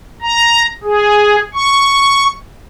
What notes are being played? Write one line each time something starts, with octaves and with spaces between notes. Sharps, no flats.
A#5
G#4
C#6